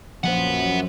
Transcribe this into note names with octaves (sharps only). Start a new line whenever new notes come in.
A#1 F#2 F3 B4 C5 F#5